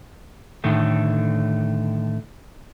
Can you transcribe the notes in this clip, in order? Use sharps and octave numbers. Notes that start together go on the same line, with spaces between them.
A2 D3 D#3 A3